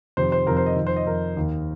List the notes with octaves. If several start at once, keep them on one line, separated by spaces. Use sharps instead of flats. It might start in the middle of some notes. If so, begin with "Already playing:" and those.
F2 C3 D#3 C5
C5
F2 C3 D#3 A#4
C5
D#5
F2 D#3
C5
D#5
F2 D#3 A#4
D#2 D#3